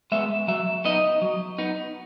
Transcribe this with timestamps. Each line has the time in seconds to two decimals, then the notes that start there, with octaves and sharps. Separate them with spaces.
0.12 G#3 B3 E5
0.48 F#3 E5
0.85 B3 D#4 D#5
1.22 F#3
1.58 B3 D#4